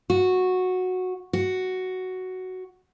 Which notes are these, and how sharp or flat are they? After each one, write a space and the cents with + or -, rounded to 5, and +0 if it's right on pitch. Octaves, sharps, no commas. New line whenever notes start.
F#4 -10
F#4 +5